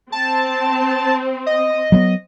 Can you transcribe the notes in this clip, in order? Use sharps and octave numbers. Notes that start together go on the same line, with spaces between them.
C4 A5
D#5
F#3 A3 B3